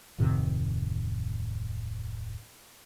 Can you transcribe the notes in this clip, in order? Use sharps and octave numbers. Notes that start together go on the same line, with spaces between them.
D1 F2 C3 D#3